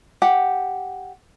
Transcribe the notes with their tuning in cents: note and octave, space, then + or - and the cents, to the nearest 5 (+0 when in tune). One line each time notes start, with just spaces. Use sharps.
G4 +0 F#5 +0